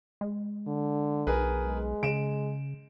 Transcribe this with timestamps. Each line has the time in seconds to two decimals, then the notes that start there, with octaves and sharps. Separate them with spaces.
0.21 G#3
0.67 D3
1.27 B1 G#4 A#4 B4
1.66 G#3
2.03 C#3 D7 E7